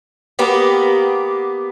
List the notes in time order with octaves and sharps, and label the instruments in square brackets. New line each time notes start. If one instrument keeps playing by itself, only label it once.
[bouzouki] A#3 B3 G4